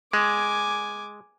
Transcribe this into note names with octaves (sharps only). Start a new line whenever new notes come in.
G#3 G#5 D6